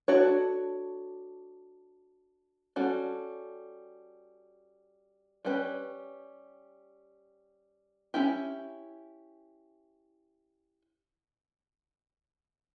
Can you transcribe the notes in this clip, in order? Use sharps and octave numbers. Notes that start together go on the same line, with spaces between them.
D4 F#4 A4 C#5
G3 C#4 F#4 A4
G3 C#4 G4 B4
C#4 E4 G4